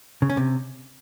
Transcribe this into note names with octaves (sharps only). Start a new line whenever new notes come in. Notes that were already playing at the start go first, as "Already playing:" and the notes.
C#3
C#4
C3